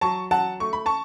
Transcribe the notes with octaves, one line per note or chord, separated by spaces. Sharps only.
F#3 A5 C#6
F#3 F#5 A5
A3 C#6
B5
A5 C#6